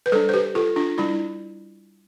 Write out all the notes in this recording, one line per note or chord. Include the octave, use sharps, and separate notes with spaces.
B4
G3 D4 A4 C5
C5
G4 B4
F4 A4
D4 F4
G3 D4 E4